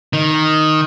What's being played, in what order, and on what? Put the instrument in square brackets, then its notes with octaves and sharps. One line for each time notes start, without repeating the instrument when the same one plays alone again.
[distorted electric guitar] D#3